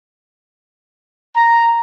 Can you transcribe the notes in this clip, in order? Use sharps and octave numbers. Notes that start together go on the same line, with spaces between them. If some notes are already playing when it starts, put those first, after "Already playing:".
A#5